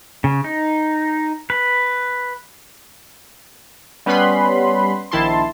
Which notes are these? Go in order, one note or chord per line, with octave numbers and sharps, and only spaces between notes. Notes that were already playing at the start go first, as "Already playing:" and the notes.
C#3
D#4
B4
G3 B3 C#4 B4 B5 C6
A#1 D#3 E4 A5 C6